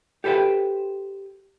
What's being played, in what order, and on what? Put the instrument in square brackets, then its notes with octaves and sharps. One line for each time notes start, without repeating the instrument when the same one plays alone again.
[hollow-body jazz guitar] G4 A4 B4 C5 G5